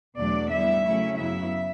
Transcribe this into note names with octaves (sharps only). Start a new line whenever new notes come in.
E2 B2 F#3 A3 D4 D5
D3 G3 B3 E4 E5
C#3 F#3 A3 C#4 E4
F#2 C#3 F#3 B3 E4 E5